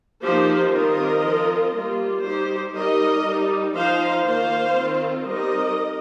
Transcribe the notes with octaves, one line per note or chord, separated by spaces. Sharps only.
F3 A#3 D#4 G4 C5
D#3 G3 C4 F4 A#4 D#5
F3 C4 F4
G3 A#3 F4
G3 D#4 G4 C5
G3 D#4 A#4 D#5
G3 D#4
F3 D#4 C5 F5
D#3 A#3 F4 C5 F5
D#3 C4 F4
G3 C4 D#4 A#4 D#5